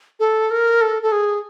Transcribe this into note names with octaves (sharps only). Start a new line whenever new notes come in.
A4
A#4
A4
A4
G#4